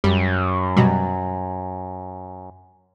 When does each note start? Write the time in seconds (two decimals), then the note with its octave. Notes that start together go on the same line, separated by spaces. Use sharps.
0.04 F#2 G3
0.76 B2 F#3 G3